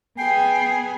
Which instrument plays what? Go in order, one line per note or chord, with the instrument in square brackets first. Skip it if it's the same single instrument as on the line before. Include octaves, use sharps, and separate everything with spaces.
[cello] B3 G#4 [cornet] G5 [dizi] G#5 [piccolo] C7